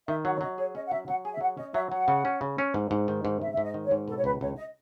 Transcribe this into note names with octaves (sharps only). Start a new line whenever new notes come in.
D#3 E5
F#3 F#5
C#5
F#3 D#5
G#4 C#5
C#4 D#5
F#5
F#3 E5
F#3 F#5
G#4 G#5
E5
F#3 F#5
C#4 D#5
F#3 E5
F#3 F#5
C#3
C#4
C#3
C#4
G#2
G#2
D#3
G#2
G#2 E5
E5
G#2
D#5
D#3
C#5
G#2
B2 A4
C#5
C#2 B4
C#2 C#5
D#5